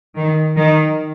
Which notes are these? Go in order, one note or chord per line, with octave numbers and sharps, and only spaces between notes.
D#3
D#3